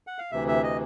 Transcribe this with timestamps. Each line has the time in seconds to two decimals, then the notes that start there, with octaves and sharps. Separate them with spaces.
0.07 F#5
0.19 F5
0.31 D2 C3 E3 E5
0.48 E5
0.63 D#5